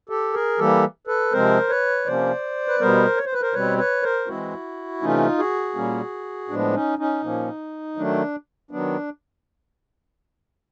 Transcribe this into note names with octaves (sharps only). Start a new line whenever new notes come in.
G4 A4
G#4 A#4
E3 G3 A#3 G4 A4
A4 B4
C3 F3 G#3 C4 A#4 C5
B4 C#5
C3 F3 A#3 C#4 C5 D5
B4
B2 G3 B3 A#4 C5
C#5
C5
B4
A#4 C5
B2 G3 C4 B4 C#5
B4 C#5
A#4 C5
E3 G#3 C4 E4 F#4
C3 E3 A3 C#4 D#4 F4
F#4 G#4
A#2 G3 A#3 C#4
A2 F3 G#3 B3 D4
C#4 D#4
C#4 D#4
A#2 F3 A#3 C#4
D#3 F#3 A3 D4
D#3 F#3 B3 D4